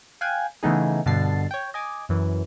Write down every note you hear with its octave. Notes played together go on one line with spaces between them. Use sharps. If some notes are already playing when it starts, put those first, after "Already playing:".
F5 G5 G#5 F#6 G#6
C#3 E3 A3 B3 D#4 G#4
G2 B2 D3 A5 A6 C7
C#5 G5
D#5 G#5 D6
F#2 E3